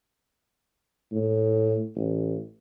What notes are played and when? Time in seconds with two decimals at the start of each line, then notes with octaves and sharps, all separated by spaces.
1.12 A2
1.95 A1